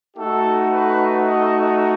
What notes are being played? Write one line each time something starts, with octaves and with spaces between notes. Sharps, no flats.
A3 D#4 F#4 A4
B4
D#5